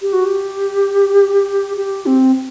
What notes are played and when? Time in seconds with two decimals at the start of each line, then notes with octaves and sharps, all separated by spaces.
0.02 G4
0.13 F#4
0.25 G4
1.77 G4
2.06 C4